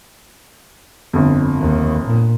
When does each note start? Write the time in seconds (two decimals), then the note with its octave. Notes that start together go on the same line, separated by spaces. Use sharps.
1.13 G1 F2
1.60 D#2
2.05 A#2